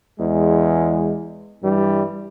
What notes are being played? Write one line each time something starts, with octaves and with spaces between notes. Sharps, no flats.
E2 G#3
G2 E3 G3